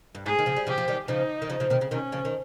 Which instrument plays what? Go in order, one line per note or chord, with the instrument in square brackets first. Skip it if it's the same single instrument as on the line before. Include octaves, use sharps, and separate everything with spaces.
[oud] G2
[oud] G#2 [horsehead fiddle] G#4
[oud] D#3
C#3 F3
G3
[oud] C#3 F3 [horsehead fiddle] G4
[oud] F3
D#3 G3
[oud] C#3 F3 [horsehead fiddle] D#4
[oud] D#3
C#3 F3
C#3 F3
C3 D#3
C#3
[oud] C3 D#3 [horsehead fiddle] C#4
[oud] C#3 F3
D#3